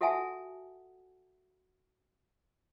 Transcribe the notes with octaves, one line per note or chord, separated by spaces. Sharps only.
F#4 A4 E5 F#5 G#5 A5